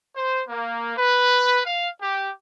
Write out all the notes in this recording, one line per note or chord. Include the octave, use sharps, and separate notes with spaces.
C5
A#3
B4
F5
G4